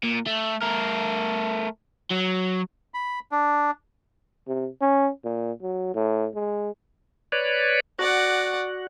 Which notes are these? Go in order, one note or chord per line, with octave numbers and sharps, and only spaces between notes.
A#2
A3
A3 A#4
F#3
B5
D4
C3
C#4
A#2
F#3
A2
G#3
B4 C#5 D5
F#4 D5 F#5